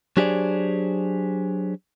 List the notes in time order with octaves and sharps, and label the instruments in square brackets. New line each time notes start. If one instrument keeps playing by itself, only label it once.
[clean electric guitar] F#3 D4 G4 G#4 C5 D5